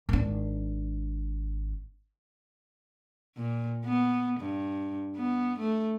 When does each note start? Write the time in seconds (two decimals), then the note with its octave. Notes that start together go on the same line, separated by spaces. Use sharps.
0.09 G#1 D4
3.36 A#2
3.85 B3
4.40 G2
5.16 B3
5.59 A3